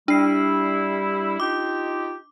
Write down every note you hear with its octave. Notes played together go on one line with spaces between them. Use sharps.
G3 D4 E4 C7
D#4 F4 G4 D6